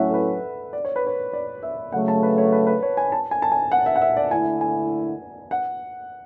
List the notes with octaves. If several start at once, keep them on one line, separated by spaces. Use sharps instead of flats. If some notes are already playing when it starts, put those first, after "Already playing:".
Already playing: A2 F#3 A3 C#4 E4 E5 F#5
A4
B4
D5
C#5
B4
C#5
D5
E5
C#3 F#3 A3 F#5
A5
B4
C#5
B4
B4
C#5
G#5
A5
G#5
A5
G#5
F#5
E5
F#5
E5
D5
D3 A3 E4 G#5
G#5
F#5